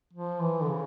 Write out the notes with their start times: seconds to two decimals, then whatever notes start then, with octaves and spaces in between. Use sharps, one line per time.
0.13 F3
0.40 E3
0.62 D3
0.68 C#3